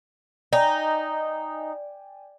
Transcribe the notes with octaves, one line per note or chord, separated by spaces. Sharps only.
D#4 D5 G5 G#5